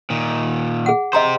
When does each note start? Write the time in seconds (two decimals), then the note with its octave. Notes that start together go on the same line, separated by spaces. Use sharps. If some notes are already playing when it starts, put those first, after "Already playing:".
0.10 A#2 D#3
0.86 G#4 F#5
1.13 G4 C5 D#5 A#5 C6